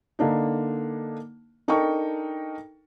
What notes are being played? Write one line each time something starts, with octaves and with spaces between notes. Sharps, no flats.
D3 A#3 D4 D#4
D4 D#4 A4 A#4 G5 C#6